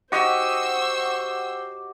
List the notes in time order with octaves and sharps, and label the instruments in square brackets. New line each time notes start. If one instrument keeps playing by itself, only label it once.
[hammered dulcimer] F#4 G4 D#5 [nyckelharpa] C5 [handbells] F#5 [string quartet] C#6 E6